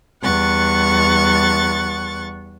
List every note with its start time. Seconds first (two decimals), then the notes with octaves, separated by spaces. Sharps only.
0.22 E2 G3 F#5 C#6 A6